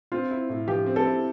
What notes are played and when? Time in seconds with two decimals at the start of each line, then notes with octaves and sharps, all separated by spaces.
0.12 C4 F4
0.31 E4
0.49 A2
0.68 F3 G4
0.86 C4
0.96 A4
1.05 E4